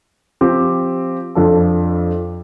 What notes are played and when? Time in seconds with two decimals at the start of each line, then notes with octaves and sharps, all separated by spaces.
0.41 F3 C4 G4
1.35 F2 F3 D4 A4